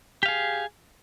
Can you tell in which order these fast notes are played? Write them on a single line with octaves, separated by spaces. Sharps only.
G4 F5 G#4